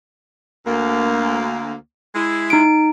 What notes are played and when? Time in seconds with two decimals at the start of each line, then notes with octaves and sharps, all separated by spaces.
0.66 D2 A#3
2.15 G#3 E4
2.50 D#4 D7